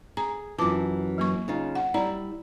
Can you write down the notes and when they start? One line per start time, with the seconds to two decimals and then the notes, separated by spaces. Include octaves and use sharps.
0.17 G#4 A#5
0.58 F#2 E3 F4 A5 D6
1.18 F#3 A#3 C#6
1.48 C#3 D#4 F4
1.75 F#5
1.94 G3 E4 D5 A#5